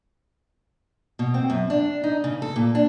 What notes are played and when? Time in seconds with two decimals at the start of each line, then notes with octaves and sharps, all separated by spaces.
1.19 B2
1.34 C4
1.50 F#2
1.70 D4
2.04 D#4
2.24 C#3
2.42 A4
2.56 A#2
2.75 D4